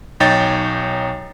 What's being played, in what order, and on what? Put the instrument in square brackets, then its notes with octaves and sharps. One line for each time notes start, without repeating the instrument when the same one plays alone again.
[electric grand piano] B1 D#4 C#5 G5 A6